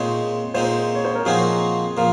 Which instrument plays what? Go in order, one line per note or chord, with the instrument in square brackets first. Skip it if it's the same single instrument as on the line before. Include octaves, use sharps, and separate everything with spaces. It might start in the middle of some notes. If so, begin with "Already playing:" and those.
Already playing: [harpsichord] A#2 G#3 C4 D#4 [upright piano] C#5
[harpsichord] A#2 G#3 C4 D#4 [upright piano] C5
[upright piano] C#5
C5
A#4
[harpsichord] A#2 F3 C4 D#4 F#4 [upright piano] G#4
[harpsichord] A#2 F3 [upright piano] A#4